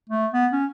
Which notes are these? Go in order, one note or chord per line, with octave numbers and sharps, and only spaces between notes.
A3
B3
C#4